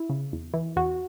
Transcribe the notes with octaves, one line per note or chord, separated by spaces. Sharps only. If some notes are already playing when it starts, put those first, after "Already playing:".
Already playing: E4
C#3
E2
E3
E2 F#4